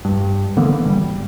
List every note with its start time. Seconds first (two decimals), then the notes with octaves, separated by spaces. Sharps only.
0.05 G2
0.57 D3 E3 A#3 B3
0.84 G#1 G3